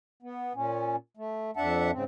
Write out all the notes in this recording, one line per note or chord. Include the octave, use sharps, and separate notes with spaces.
B3
A#2 C#4
A3
F2 D4 E5 F#5 A5
G#2 C#3 C4